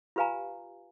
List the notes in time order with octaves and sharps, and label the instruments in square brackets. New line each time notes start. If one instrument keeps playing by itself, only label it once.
[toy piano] F4 G4 B4 F5 G#5 A#5